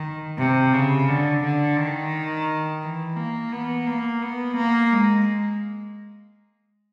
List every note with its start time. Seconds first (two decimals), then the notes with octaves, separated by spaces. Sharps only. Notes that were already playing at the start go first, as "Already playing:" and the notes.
Already playing: D#3
0.38 C3
0.73 C#3
1.09 D3
1.43 D3
1.78 D#3
2.83 E3
3.17 A#3
3.52 B3
3.87 A#3
4.22 B3
4.56 A#3
4.92 G#3